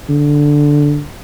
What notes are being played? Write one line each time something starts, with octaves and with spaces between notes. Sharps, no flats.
D3